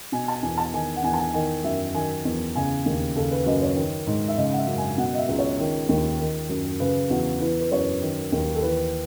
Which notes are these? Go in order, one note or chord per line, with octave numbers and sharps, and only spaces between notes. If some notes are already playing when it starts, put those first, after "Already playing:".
B2 G#5
A5
E2 G#5
A5
D#3 G#5
F#5
E2 G#5
A5
G#5
D#3 G#5
F#2 E5
D#3 G#5
E2
C#3 G#5
D#2
C#3 A4
B4
F#2 D#5
C#5
D#3
G#2
E5
C#3 D#5
F#5
E5
F#2
G#5
B2 F#5
D#5
E5
C#2
C#5
D#3
D#2
D#3
F#2
C#3 B4
E2 F#4
E3 B4
B4
F#2 C#5
D#3
D#2
A4
E3 B4